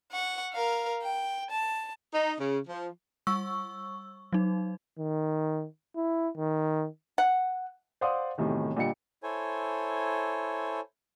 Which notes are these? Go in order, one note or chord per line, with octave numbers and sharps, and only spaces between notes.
F#5 C#6
A#4 F5
G5
A5
D#4
C#3
F3
G3 C#6 E6
F#3 D#4
D#3
E4
D#3
F#5
C5 D5 F5 F#5 C6 D#6
B1 A2 C3 D#3 E3
A#2 D3 G3 D#5 G5 C#7
E4 A4 C5 C#5 G#5